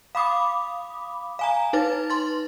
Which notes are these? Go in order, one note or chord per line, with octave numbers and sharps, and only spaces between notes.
F5 B5 D6 D#6
F5 G#5 A#5
D#4 B4 A6
C6 A6